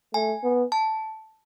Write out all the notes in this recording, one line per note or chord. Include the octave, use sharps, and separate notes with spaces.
A3 G#5
B3
A5